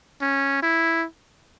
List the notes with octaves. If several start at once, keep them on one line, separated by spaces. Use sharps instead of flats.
C#4
E4